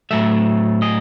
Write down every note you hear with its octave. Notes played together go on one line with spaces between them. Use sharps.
A2 F#3 A3 E5
D#5